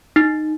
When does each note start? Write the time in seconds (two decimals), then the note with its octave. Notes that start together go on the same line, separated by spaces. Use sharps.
0.16 D#4